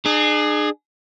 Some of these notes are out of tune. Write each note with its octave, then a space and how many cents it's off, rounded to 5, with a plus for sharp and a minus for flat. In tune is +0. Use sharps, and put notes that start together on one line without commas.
D4 +45 G#4 +10